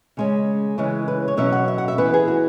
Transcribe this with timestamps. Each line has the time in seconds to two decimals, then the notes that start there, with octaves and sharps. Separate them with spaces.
0.17 C#3 G#3 C#4
0.78 C#3 E3 G#3 C#4
1.08 B4
1.28 C#5
1.37 B2 F#3 C#4 E5
1.52 F#5
1.68 E5
1.78 F#5
1.88 E5
1.98 E3 B3 B4
2.14 G#4
2.28 F#4